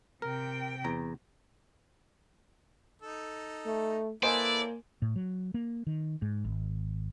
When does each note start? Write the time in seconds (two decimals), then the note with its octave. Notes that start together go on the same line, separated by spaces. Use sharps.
0.22 C3 A#4 G5
0.85 E2 A#5
3.02 D#4 A4
3.66 A3
4.23 A#3 E4 A4 B4 C5 D5 D#5 G#5
5.02 A2
5.16 F#3
5.54 A#3
5.87 D#3
6.22 G#2
6.45 G#1